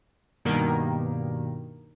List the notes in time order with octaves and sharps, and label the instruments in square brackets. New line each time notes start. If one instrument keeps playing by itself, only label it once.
[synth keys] G2 B2 D#3 A#3